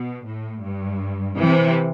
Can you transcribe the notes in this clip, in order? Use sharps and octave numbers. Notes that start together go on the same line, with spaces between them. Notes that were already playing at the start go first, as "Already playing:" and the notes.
Already playing: B2
A2
G2
C3 E3